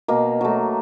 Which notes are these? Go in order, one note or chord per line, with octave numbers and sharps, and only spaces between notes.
B2 A#3
F#3 A3